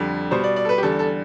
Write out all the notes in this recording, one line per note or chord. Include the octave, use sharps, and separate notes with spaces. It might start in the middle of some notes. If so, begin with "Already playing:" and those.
Already playing: F2 D3 G3
B2 G3 C5
D5
D5
A4
B4
G4
E2 D3 G3 A4
A4